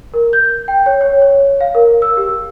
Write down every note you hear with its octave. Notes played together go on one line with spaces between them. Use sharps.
A#4
G6
G5
C#5
C#5
C#5
F5
A#4
E6
G4